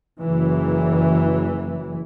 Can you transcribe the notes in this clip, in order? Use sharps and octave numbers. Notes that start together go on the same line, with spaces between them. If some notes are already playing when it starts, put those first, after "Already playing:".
F#1 E3